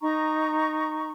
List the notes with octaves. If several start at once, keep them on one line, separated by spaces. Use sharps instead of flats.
D#4 A#5 C#6